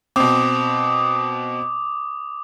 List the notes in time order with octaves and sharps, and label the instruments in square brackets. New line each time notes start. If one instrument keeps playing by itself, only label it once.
[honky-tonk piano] B2 C4 [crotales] D6 D#6